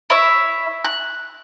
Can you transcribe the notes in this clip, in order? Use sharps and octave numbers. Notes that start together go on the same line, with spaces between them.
E4 C#5 E5
F#6